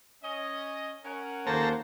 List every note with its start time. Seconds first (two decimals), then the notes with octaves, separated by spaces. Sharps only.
0.24 C#4 D#5
1.04 C#4 A#4 F#5
1.47 D#2 A#3 A4 C5 A#5